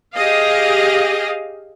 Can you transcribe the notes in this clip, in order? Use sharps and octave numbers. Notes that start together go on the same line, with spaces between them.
G4 G#4 D#5 F5